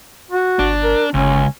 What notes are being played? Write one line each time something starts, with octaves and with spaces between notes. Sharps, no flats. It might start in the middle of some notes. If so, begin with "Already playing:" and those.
F#4
G1 D4
A#4
G1 C#2 C#4